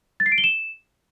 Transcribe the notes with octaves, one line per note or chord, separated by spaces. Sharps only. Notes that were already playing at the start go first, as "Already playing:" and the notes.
A6
C7
D7
G7
E7